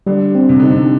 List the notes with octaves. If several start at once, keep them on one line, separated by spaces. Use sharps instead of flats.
D3 G3
C4
C3
D3 D#4
C3